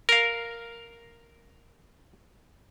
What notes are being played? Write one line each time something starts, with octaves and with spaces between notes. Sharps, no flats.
A#4 F5